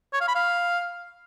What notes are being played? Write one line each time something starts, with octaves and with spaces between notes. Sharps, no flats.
C#5
F5
B5
F5